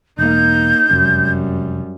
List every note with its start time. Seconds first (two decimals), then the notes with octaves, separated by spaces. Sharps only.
0.19 E1 A#3 D#4 G6
0.91 F1 F#2 G3